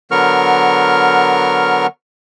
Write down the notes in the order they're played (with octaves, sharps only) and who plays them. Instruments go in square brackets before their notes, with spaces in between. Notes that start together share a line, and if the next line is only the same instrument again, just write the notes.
[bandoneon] D3 F#3 B3 A#4 C#6 F6